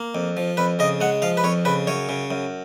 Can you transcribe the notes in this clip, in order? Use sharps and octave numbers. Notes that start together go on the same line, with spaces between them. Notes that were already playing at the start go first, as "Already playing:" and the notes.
Already playing: A#3
F2
F3
F2 B4
C#3 D#5
G#3 F#5
F3 F5
B4
F2 C#5
C#3 B4
F#2 C#5
C#3
F#2